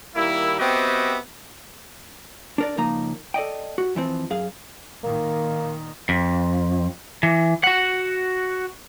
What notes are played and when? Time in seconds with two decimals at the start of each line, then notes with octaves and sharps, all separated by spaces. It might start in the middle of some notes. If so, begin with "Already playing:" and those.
0.16 D#3 G3 A#3 E4
0.59 B3 C4 F#4 G4 D#5 E5
2.58 D4 A#4 D5
2.77 C#2 F3 A#3 D#4 A#5
3.34 A4 D5 D#5 G5
3.78 F#4
3.95 F2 E3 F3 C4
4.30 F#2 G#4 F5
5.03 A#2 D#3 A#3
6.09 F2
7.23 E3
7.64 F#4 F#5